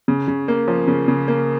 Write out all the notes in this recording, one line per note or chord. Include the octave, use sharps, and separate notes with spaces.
C#3
C#3
A#3
F3
C#3
C#3
A#3